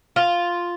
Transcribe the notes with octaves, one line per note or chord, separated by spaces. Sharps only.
F4